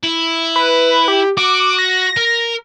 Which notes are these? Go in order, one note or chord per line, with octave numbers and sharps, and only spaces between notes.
E4
B4
G4
F#4 D6
A#6
A#4